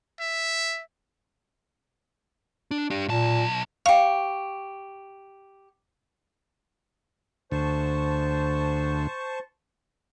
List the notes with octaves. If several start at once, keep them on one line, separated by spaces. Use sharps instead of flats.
E5
D4
D4 G4
B1 A#2 A5
G4 F5 C#6
D2 C5 A5 C#6